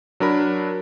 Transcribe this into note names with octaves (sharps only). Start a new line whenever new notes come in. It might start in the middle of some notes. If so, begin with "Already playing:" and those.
F#3 D4 A#4 B5